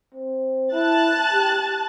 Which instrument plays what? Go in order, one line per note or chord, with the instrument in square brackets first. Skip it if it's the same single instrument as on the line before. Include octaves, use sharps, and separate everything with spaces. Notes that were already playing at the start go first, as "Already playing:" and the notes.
[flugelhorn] C4
[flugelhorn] E4 [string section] A5 F#6 A6
[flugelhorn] G4